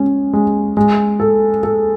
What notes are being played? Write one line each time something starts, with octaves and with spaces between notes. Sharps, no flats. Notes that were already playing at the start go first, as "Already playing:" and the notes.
Already playing: G#3 C#4
G#3
G#3
A4
A4